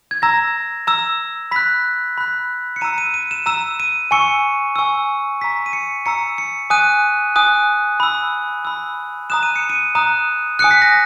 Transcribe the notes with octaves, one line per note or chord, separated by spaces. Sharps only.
G#6
A#5 E6 A#6
A#5 E6
B5 F#6 B6
B5 F#6
C#7
A#5 E6 D#7
D#7
D#7
E7
A#5 E6 E7
D#7
G#5 C#6 E6 C#7
G#5 C#6 E6
A#5 E6 B6
D#7
C#7
A#5 E6 C#7
C#7
G#5 D#6 F#6 D#7
G#5 D#6 F#6
B5 E6
B5 E6
A#5 D#6 F#6 E7
D#7
C#7
D#7
A#5 D#6 F#6
G#5 D#6 F#6 C#7
B6
A#6